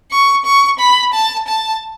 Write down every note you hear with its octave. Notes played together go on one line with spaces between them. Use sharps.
C#6
C#6
B5
A5
A5